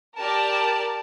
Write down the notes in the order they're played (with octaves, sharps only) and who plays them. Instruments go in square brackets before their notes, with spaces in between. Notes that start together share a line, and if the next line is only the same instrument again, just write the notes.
[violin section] G4 A#4 D5 A5